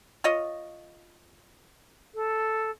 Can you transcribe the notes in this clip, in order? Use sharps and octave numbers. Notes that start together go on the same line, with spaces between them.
F4 C#5 D#5
A4